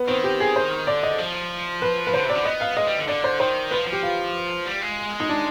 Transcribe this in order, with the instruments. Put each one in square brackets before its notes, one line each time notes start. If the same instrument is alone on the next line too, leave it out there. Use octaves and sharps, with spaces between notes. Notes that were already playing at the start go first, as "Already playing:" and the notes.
Already playing: [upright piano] B3
[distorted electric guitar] D#3 [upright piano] C4
[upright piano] G4
G#4
C5
[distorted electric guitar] D3 [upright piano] D5
[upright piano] D#5
[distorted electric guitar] F3
[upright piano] B4
B4
[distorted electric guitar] D3 [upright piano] C5
[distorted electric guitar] C3 [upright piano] D5
[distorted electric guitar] D3
[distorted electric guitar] B3 [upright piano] D#5
[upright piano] F5
[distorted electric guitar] G#3 [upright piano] D#5
[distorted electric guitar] G3
D3
[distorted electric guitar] D3 [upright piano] D5
[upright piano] C5
[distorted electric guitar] D#3 [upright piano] C5
[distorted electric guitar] F3 [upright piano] B4
[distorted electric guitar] F3
[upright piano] G4
F4
[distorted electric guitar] G3
G#3
[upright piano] D#4
D4